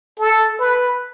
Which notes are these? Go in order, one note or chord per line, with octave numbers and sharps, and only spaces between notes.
A4
B4